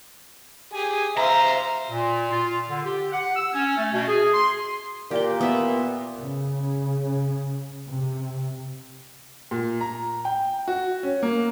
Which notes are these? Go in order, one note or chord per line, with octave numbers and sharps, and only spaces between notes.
G4 G#4 G#5
C5 E5 F5 A#5
A#2
F4
D3
G4
F#5
E6
C#4
A3
B2
G#4
C6
A#2 G4 G5
B3 E5
C#3
C3
A#2
A#5
G5
F#4
C#4
A#3